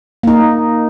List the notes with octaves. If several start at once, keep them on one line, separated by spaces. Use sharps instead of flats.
A#3 D#4